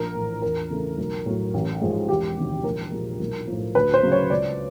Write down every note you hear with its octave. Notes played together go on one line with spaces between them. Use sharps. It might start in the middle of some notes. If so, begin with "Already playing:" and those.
Already playing: A#1 A#4
A2 E3
E2 A#4
C#3 E3 A3
B1
A2 F#3
A1
G#2 F3 G#3
E1 G4
D2 C3 D#3
A#1 A#4
A#2 F3 G#3
B1
A2 F3
D2 B4
C5
C#3 F#3
C#5
C#2 D5